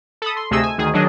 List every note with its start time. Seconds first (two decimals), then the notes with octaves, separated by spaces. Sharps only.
0.22 A4 B5 D#6
0.37 C6
0.51 D2 C3 A3 G#4 D#5 E6
0.63 G#5
0.78 D2 D#3 G#4
0.93 D#3 F#3 D4 G#4 D#5